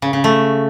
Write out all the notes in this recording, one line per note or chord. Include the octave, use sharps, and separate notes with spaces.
C#3
C#3
A3